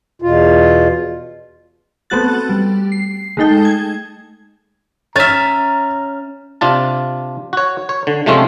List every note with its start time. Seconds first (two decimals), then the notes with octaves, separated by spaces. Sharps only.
0.22 E2 B2 F4
2.10 A3 B3 C4 F#4 F#6 A6
2.49 G3
2.92 C7
3.37 G#3 A3 D#4 A4 G5
3.65 G#6
5.16 C#4 E5 A#5 F6 A6
6.61 C3 D4 F4 A5
7.53 F#4 C#5
7.89 C#5
8.07 D3
8.26 C3 F3 G#3 A3 C4 C#4